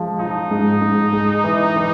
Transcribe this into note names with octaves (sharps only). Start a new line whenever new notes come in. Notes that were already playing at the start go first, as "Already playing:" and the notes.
Already playing: F3 G#3
F3 D#4
G#2
G#2
G#3
E3
E3